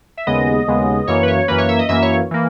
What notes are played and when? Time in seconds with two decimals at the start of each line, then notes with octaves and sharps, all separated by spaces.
0.17 E5
0.27 D#2 C#3 G#3 B3 D#5
0.67 D#2 C#3 G#3 B3
1.07 F#2 E3 A#3 C#5
1.23 B4
1.28 C#5
1.48 F#2 E3 A#3 B4
1.58 C#5
1.69 E5
1.79 D#5
1.89 F#2 E3 A#3 E5
2.02 C#5
2.31 E3 A#3